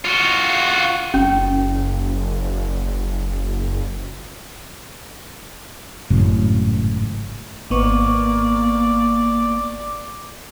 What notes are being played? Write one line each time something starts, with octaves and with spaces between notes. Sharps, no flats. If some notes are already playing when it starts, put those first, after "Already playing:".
F4 F#4
F#1 C#4
G#1 F#2 A2 C#3
G#1 A#3 B3 D5 C#6